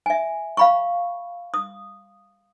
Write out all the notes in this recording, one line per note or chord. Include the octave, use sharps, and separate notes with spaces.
E5 G#5
F5 B5 C#6
D#6